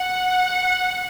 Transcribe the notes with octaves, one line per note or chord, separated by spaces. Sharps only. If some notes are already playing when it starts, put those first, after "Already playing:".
Already playing: F#5